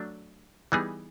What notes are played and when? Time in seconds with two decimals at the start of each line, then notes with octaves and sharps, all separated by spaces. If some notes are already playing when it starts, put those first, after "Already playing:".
Already playing: F#3 A3 D4
0.72 E3 G3 B3 D#4 G#4